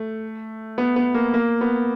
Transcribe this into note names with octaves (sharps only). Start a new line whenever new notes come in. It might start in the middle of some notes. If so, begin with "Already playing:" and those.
Already playing: A3
B3
B3
A#3
A#3
B3